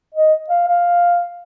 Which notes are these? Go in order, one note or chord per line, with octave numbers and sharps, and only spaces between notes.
D#5
F5
F5